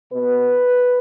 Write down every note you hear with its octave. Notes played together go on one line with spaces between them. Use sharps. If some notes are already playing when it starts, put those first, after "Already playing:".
B2 B3 B4